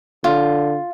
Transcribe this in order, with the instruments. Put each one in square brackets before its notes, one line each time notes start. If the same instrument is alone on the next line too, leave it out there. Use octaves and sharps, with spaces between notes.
[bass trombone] D3 [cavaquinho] F4